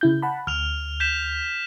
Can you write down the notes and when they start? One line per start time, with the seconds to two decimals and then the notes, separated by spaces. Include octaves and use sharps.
0.01 C#3 E4 G6
0.22 F#5 A5 B5
0.47 D2 F6 F7
1.00 G6 B6 E7